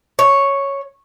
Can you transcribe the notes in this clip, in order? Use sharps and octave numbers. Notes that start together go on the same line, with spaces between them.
C#5